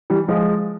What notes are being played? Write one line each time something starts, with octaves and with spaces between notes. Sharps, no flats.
E3 G3
F3 G#3